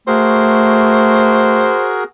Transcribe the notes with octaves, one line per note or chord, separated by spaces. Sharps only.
A3 F#4 G#4 A#4 C5